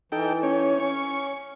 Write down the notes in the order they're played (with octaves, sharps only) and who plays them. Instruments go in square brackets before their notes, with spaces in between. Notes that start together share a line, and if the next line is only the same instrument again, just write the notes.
[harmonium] E3 [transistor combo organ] D#4 A4 G5
[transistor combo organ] C#4 C#5
[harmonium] C#4 [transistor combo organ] C#6